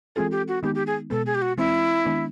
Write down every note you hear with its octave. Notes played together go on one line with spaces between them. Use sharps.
E3 G#3 C4 F4 G#4 A4
G4
F#4
D#3 G#3 B3 D#4 G4
G4
G#4
B2 G#3 B3 A4
G#4
G4
F#4
E3 G#3 C4 E4
D#3 G#3 B3 D4